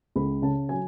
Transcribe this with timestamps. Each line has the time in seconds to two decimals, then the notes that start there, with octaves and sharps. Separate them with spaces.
0.16 C#2 B5
0.42 C#3 A5
0.69 F#3 G#5